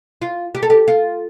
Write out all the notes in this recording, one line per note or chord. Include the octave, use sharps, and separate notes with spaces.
F4
G4
A4
G4
F4